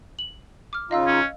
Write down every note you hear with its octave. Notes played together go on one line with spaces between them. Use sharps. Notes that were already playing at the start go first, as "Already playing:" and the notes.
F#7
D6 F6
C#3 D#4 F4 D#5 F5 E6
C#4